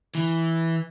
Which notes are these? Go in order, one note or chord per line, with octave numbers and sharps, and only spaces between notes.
E3